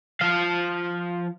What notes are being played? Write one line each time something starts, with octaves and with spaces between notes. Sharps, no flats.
F3 F5